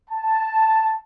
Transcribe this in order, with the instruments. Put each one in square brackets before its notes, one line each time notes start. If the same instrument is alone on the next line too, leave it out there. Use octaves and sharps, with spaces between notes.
[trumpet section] A5